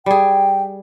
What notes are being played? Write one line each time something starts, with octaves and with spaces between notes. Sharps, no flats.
G3 G#4 G5